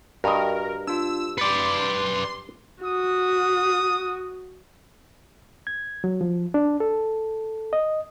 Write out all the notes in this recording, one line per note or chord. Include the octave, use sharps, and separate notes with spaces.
G2 F#4 A#4 D#5 A#5
D4 F4 E6
B4 D5 C6 D6 A6 C#7
F#4 D#6
G#6
F#3
F3
D4
A4
D#5